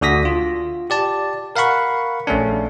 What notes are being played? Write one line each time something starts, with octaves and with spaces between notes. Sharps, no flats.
D2 D3 F#4 D#6 A#6 B6
F4
G4 D5 A5
A#4 F5 F#5 B5 C#6
A#1 A3 C#4 D4